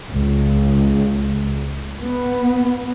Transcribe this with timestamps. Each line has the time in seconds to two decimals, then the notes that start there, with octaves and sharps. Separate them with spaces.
0.13 C#2
2.04 B3